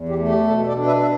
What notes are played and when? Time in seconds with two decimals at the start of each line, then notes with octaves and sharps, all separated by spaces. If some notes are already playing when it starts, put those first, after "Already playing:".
Already playing: E2
0.09 G4
0.19 A3
0.28 G4
0.47 B2 A4
0.67 A4 D5
0.76 D4
0.86 B4 E5
1.02 E5